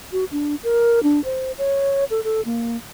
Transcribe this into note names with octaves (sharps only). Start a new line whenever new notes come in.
F#4
D4
A#4
D4
C5
C#5
A4
A4
A#3